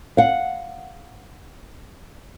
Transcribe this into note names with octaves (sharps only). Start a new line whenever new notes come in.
F5 F#5